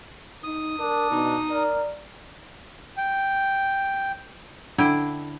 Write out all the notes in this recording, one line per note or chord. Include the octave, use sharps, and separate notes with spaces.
D#4 D#6
D4 A#4
B2 D#4
A#4 D5
G5
D3 E4 G5